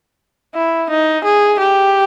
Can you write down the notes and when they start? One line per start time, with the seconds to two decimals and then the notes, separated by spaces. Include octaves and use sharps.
0.55 E4
0.90 D#4
1.25 G#4
1.59 G4